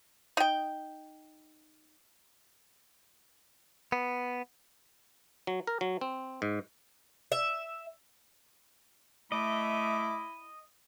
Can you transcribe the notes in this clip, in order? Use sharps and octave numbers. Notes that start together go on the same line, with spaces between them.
D#4 G5
B3
F#3
A#4
F#3
C4
G#2
E5
A3 E4 D#5 D6